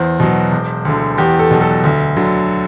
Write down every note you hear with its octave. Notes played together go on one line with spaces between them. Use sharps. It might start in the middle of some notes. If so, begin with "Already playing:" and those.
Already playing: E2 C5
B2 F#3
E1
D2 D3
E2 G4
A4
B2 F#3
A4
D2
D3 F#3